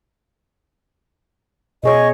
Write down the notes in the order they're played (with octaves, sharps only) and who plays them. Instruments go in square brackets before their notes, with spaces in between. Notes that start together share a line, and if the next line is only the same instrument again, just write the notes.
[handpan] B2 G#4 C#5 [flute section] D#5 C#6